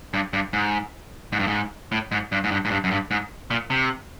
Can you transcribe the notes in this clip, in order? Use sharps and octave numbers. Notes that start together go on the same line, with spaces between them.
G2
G2
G#2
G#2
G2
G#2
A2
G#2
G2
G#2
G2
G#2
G2
F#2
G2
G#2
A#2
C3